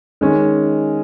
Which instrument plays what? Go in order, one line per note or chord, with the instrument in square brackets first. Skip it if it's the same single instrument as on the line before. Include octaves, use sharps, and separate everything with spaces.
[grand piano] D#3 G#3 C#4